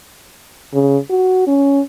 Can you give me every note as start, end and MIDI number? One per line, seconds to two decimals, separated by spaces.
0.74 0.98 49
1.10 1.43 66
1.47 1.81 61